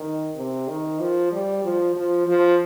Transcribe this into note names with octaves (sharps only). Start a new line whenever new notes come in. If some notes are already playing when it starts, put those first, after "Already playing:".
Already playing: D#3
C3
D#3
F3
G3
F3
F3
F3